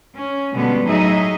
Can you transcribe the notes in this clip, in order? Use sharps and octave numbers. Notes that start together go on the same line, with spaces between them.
C#4
B2 D3 G3 G#3 B3 C#4
A2 F#3 D#4 G#4 D#5 E5